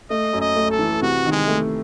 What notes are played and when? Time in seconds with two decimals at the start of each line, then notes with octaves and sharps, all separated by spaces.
0.10 A3 D#5
0.33 F#2
0.41 D#5
0.56 A3
0.71 A4
0.79 E3
1.02 C3 F#4
1.25 D#3
1.31 G#3
1.48 A3